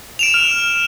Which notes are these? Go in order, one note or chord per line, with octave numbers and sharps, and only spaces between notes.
D7 E7 F7
F6